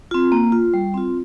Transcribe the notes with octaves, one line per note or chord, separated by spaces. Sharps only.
C4 F4
A#3
F4
G3
C4 F4